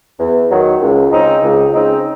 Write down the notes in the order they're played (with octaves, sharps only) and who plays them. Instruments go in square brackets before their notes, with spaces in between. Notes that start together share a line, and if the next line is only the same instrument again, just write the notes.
[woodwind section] E2
D#3 F#3
C#2
C#3 G#3 C4 D#4
C#2
C#3 G#3 C4 D#4